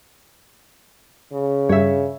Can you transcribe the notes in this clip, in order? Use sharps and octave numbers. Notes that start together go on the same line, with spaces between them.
C#3
G2 C#5 E5